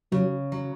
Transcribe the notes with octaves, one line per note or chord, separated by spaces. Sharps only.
C#3 F#3
F#3